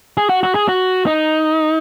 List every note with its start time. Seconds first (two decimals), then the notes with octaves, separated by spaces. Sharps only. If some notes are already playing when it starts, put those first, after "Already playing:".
0.17 G#4
0.29 F#4
0.43 F#4
0.55 G#4
0.69 F#4
1.06 D#4